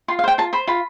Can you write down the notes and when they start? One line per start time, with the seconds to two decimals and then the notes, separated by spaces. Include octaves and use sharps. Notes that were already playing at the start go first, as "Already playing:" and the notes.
0.08 F4 C6
0.19 F5
0.24 C5 G5
0.38 F4 A5
0.53 C5 B5
0.67 F4 B5